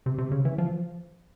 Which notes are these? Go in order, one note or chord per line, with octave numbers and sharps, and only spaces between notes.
C3
C3
C#3
E3
F3